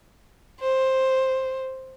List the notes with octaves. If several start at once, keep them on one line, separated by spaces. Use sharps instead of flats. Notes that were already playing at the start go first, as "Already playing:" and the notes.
C5